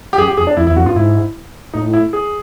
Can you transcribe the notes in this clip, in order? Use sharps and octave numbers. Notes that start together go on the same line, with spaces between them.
G4
F#2 G#4
G4
F2 G#4
D4
F2 E4
E2 E4
F2 F#4
G2 F4
G#2 E4
A2 D#4
E4
G#4